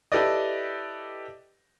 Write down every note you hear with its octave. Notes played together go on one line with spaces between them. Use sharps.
E4 G4 A4 B4 D5 D#5